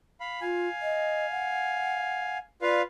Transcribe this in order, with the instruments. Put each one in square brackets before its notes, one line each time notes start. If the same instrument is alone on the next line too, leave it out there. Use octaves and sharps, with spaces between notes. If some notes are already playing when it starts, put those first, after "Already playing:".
[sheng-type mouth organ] F5 B5
[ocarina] F4 [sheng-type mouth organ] F5 G#5
[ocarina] D#5
F#5
[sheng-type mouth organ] F4 B4 F5 [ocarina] D5